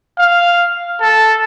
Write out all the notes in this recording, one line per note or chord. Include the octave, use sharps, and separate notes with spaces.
F5
A4